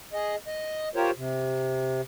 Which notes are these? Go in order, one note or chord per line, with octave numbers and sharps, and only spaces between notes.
G#4 D#5
D#5
F4 G4 A#4 C5 C#5
C3